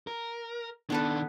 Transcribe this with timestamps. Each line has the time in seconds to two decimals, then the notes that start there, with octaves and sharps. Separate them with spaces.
0.07 A#4
0.90 D#3 B3 D4 A4 B4